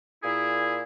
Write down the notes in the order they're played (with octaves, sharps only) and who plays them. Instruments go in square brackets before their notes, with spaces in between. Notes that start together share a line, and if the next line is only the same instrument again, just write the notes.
[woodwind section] A#2 E4 G#4